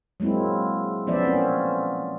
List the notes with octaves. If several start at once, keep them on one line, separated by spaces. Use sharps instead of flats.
F#3 G#3 A#3 C4 E4
F3 B3 C#4 C5 D5 E5
A#3 C4 C#4